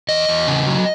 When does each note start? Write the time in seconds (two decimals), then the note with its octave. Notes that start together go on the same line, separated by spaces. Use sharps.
0.09 E2 D#5
0.29 E2
0.48 C#3
0.67 F#3